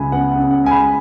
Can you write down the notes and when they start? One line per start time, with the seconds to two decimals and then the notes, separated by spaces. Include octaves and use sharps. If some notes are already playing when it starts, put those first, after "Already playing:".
Already playing: C#2 G#3 G#5 B5
0.12 B3 F#5
0.32 F#5
0.38 C#3
0.51 F#5
0.64 G#3 G#5
0.71 B5